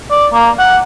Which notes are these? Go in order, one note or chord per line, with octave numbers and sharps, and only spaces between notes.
D5
A#3
F#5